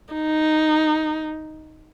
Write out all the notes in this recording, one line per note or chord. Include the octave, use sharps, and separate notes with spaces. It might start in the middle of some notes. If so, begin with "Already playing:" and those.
D#4